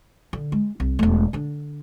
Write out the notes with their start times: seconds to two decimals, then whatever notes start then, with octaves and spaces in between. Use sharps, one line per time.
0.33 D3
0.52 G#3
0.80 C2
0.99 E1 A3
1.33 D3 D4